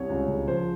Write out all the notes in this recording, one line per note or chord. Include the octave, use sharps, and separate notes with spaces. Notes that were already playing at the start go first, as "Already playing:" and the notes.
Already playing: C2 C#5
C#2
C#3
F3 C5